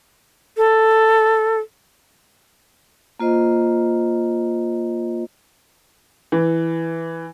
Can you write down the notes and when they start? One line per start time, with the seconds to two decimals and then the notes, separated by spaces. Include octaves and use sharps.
0.57 A4
3.20 A#3 F4 C5 D#5
6.32 E3